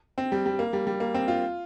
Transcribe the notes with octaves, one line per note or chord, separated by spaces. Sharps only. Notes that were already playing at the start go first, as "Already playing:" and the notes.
C4
G3
G3
A#3
G3
G3
A#3
C4
F4